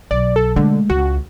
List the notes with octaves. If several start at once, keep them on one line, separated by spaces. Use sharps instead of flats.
B1 D5
A4
D3 G#3 A3
C#2 F#4